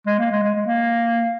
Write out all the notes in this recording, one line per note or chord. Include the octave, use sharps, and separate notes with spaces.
G#3
A#3
G#3
G#3
G#3
A#3